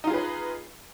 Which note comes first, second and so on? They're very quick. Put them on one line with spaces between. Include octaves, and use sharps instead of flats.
D#4 F4 G#4 B4